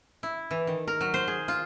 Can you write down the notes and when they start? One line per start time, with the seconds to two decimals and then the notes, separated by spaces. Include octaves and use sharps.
0.23 E4
0.51 E3
0.67 D#3
0.88 A#4
1.01 F#3
1.14 C5
1.28 G#4
1.48 F4